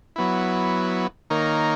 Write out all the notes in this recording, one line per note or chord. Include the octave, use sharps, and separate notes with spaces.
F#3 B3 E4
D#3 A#3 D#4 A#4 C#5